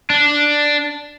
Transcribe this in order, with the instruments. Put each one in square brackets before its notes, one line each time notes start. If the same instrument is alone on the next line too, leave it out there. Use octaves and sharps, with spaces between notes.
[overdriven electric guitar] D4